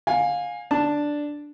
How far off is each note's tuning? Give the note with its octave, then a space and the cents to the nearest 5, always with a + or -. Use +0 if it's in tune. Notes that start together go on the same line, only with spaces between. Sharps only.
F5 +25 G#5 -15
D4 +0 A5 +0